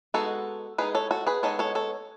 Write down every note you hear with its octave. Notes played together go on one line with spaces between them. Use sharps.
G#3 B3 D#4 F#4 A4
G#3 B3 D#4 G#4 B4
A4 C#5
F#4 A4
G#4 B4
G#3 B3 D#4 A4 C#5
A4 C#5
A4 C#5